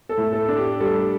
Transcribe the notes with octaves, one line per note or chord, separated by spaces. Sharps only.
A4
A2
A4
D4
G4
G3 A4